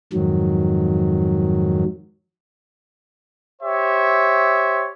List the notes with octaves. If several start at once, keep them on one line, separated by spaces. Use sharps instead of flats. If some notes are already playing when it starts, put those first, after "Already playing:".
F2 G#2 D#3 F#3
G4 C5 C#5 E5